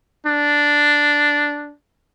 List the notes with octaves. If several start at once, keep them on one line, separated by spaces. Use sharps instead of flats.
D4